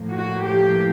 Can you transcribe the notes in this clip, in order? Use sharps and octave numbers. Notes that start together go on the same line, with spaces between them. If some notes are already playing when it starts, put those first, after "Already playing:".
Already playing: A2 F3 A#3
F#4
G4